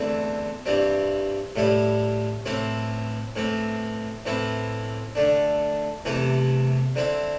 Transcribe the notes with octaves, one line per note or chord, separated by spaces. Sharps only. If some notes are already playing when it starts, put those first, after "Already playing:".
Already playing: E2 D3 A3 C4 E4
G2 E3 G3 C4
A2 G3 E4
A2 E3 C4 E4
A2 E3 C4
A2 E3 C4 E4
D3 A3 D4
E2 C3 E3 A3 E4
D3 C4 E4